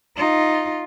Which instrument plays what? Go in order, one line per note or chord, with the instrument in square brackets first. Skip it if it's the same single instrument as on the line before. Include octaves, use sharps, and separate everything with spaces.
[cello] D#4 F4